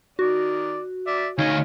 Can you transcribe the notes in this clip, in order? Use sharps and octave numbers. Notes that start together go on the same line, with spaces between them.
D#3 F#4 D5
D5 E5
D2 D#4 C#5 D#5 F5 G#5